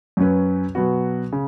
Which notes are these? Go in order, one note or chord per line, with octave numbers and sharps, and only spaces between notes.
F#2 F#3 C#4 B4
B2 F#3 B3 F#4
C#3